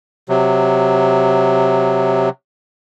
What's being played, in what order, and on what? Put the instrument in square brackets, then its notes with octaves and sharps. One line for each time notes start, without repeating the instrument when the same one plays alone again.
[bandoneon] C3 F#3